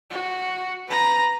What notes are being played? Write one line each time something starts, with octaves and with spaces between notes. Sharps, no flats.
F#4
B4 A#5